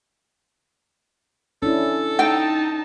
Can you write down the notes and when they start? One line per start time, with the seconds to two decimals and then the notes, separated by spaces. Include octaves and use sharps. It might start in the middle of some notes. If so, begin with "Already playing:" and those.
1.62 C#4 D4 E4 A4
2.19 D#4 G5 A5